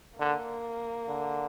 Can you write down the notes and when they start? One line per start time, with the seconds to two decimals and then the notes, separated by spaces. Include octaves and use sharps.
0.19 D3 A#3
1.08 D3